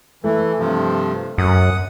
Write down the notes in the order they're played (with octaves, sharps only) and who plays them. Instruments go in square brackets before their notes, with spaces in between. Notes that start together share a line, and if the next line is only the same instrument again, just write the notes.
[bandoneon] E3 [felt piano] A3
[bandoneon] G2 C3 F3
[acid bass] F#2 [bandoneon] F#5 D#6